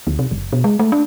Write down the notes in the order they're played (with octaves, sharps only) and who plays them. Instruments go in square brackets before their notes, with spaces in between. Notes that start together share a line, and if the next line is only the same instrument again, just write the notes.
[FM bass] D2
C3
F#1
B2
G#3
A3
D4